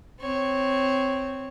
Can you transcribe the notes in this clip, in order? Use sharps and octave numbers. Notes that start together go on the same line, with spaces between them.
C4 C#5